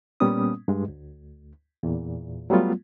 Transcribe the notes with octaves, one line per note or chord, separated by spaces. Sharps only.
A#2 G3 A#3 B3 C#4 D#6
G2 G#3
D2
E2 A#2
F#3 G3 A3 B3 F4